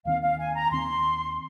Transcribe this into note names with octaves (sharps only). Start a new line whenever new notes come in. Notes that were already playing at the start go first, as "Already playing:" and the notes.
D#2 D#3 C4 F5
F5
G#5
A#5
D#2 D#3 C4 C6